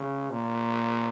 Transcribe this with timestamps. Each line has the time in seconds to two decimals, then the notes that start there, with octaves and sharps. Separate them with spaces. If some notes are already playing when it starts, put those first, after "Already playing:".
Already playing: C#3
0.30 A#2